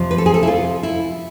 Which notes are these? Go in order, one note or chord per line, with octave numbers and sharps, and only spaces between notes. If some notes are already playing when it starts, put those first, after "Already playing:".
Already playing: F2 C3 F3
B4
A4
G#4
A4
E4
F4
E4